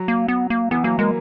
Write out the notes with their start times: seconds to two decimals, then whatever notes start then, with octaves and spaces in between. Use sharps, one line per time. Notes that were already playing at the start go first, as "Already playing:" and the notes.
Already playing: F#3
0.08 A#3
0.28 B3
0.50 A#3
0.71 E3 B3
0.84 F#3 A#3
0.99 G#3 A#3